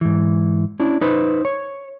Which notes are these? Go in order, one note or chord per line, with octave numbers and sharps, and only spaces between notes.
G#2 E3
C#4 D4 E4
D#4 B4 C5
C#5